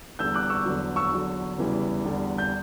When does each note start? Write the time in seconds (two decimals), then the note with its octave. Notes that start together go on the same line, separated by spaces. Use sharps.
0.19 E2 D3 G3 E6 G6
0.34 D6 F#6
0.50 C#6 E6
0.66 E2 D3 F#3
0.96 C#6 E6
1.11 E2 D3 F#3
1.58 E2 C#3 E3 G3
2.04 E2 D3 G3
2.38 G6